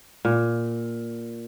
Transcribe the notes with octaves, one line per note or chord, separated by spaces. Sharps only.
A#2